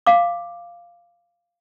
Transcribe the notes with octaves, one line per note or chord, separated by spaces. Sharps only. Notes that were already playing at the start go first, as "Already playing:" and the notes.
F5 D6